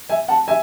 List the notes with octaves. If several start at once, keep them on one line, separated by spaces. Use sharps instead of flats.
E5 G#5
F#5 A5
E5 G#5